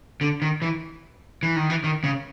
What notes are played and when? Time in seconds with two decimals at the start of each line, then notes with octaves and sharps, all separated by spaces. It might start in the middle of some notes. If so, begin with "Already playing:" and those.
0.21 D3
0.42 D#3
0.62 E3
1.43 E3
1.56 D#3
1.70 E3
1.84 D#3
2.04 C#3